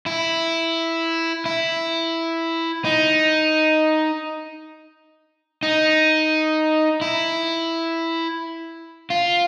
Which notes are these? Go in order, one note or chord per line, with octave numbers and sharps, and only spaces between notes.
E4
E4
D#4
D#4
E4
F4